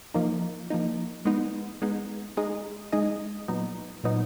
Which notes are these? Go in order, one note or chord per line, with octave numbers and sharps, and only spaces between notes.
F3 A#3 D#4
F3 A#3 D#4
G#3 B3 D#4
G#3 B3 D#4
G#3 D#4 G#4 D#5
G#3 D#4 G#4 D#5
A#2 F#3 B3 D#4
A#2 F#3 B3 D#4